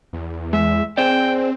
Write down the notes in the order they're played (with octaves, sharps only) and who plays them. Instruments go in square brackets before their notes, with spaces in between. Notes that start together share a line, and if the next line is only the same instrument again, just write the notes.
[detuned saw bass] E2
[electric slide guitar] G#3 [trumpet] E5
[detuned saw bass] C4 [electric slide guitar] G#4 C5 D5 [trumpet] G5